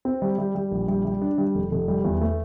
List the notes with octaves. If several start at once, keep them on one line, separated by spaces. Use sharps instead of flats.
C4
G3
G3
G3
A#1
G3
G3
D4
G3
F1
F1
G3
E2
A3